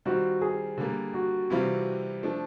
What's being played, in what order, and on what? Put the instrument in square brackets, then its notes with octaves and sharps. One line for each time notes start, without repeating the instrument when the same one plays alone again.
[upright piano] D#3 G3 C4 F4 [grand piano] F#4
[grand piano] G#4
[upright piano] D3 G3 A#3
[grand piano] F#4
[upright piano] C3 E3 G3 C4 F4
F3 A3 D4